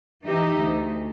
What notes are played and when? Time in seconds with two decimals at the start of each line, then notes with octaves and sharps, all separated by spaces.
0.24 E3 D#4 G4 D#5 E5
0.58 D2